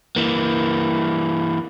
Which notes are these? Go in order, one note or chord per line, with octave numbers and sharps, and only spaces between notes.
E3 A#3